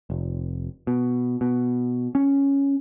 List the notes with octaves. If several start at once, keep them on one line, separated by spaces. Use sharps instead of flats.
F1
B2
B2
C#4